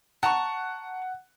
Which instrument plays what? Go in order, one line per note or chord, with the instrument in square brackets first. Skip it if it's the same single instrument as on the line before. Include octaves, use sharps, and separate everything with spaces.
[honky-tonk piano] F#5 [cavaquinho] A5 A#5 C#6